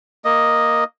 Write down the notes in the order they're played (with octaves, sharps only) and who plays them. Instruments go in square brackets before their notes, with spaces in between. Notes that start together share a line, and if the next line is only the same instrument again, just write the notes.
[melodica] A#3 D#5